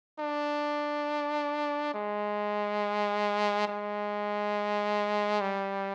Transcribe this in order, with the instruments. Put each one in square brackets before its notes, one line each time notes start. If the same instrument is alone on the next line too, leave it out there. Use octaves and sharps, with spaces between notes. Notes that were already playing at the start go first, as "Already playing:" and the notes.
[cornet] D4
G#3
G#3
G3